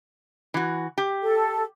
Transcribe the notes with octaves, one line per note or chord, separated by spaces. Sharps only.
E3 F#4
G4
A4